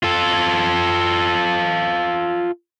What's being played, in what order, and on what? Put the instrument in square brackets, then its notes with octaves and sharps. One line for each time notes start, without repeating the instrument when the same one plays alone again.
[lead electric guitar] F4 A4